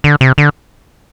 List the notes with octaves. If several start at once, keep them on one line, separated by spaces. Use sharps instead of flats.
D3
C3
D3